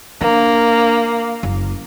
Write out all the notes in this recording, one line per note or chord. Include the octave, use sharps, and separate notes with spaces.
A#3 D4
F#1